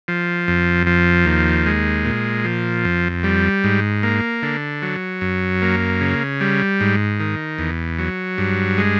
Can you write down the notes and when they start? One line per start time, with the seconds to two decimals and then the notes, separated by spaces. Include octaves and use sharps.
0.08 F3
0.48 F2
0.87 F3
1.26 D#2
1.66 G#3
2.05 A#2
2.44 F3
2.85 F2
3.24 G3
3.64 G#2
4.03 A#3
4.43 D3
4.82 F#3
5.21 F#2
5.62 A#3
6.01 C#3
6.41 G3
6.80 G#2
7.20 D#3
7.58 E2
7.98 F#3
8.38 G2
8.78 G#3